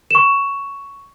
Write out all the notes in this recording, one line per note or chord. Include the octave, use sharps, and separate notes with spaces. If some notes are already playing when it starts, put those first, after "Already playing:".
C#6 E7